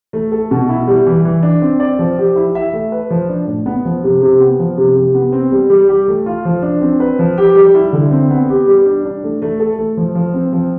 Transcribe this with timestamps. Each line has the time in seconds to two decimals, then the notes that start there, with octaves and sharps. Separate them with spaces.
0.13 A3
0.32 A4
0.51 B2
0.69 E4
0.87 G3
1.07 E3
1.25 E3
1.43 D4
1.62 C4
1.80 D5
1.99 F3
2.18 G4
2.36 E4
2.55 E5
2.73 A3
2.92 B4
3.10 F3
3.29 D4
3.47 A2
3.66 B3
3.85 F3
4.04 C3
4.22 C3
4.40 B3
4.59 F3
4.78 C3
4.96 C3
5.15 B3
5.33 C4
5.52 G3
5.70 G3
5.89 G4
6.08 A3
6.26 F4
6.45 F3
6.62 D4
6.81 C4
7.00 B4
7.19 F3
7.38 G4
7.55 G3
7.75 E4
7.92 D3
8.11 C4
8.30 B3
8.49 G4
8.67 G3
8.86 D4
9.05 D4
9.23 A3
9.42 A3
9.60 A4
9.78 A3
9.97 F3
10.15 F3
10.34 C4
10.52 F3